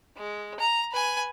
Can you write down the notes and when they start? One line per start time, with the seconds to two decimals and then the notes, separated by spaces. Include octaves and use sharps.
0.17 G#3
0.59 A#5
0.92 B4 G#5